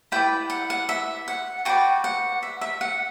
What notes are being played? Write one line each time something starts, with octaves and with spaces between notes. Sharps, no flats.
E4 B4 D5 G5
F#5
F#5
E5
F#5
F#4 B4 D5 G5
F#5
E5
E5
F#5